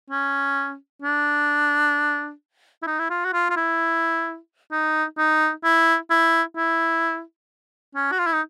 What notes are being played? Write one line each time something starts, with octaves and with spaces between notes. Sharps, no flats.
C#4
D4
E4
D#4
E4
F4
F#4
F4
F4
E4
D#4
D#4
E4
E4
E4
C#4
F#4
F4
E4
D#4